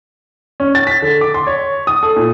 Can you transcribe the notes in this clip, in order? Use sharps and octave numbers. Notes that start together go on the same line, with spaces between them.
C#4
A6
B6
D3
D6
C6
C#5
D#6
A4
A#2